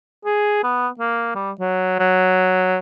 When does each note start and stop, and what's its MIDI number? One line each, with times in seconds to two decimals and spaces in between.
0.25 0.60 68
0.64 0.88 59
1.00 1.32 58
1.35 1.51 55
1.60 1.95 54
1.99 2.78 54